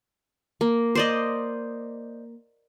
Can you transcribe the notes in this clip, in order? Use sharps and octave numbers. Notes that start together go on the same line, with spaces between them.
A#3
C5 D5 D#5